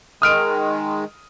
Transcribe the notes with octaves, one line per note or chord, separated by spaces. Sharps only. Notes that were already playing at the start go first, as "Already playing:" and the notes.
D#3 G#3 D#6 F6 D7